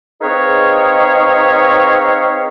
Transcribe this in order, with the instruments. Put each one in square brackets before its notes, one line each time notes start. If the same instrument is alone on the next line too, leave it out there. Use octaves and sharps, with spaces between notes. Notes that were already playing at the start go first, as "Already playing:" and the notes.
[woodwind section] C4 D#4 G#4 B4 C#5 F5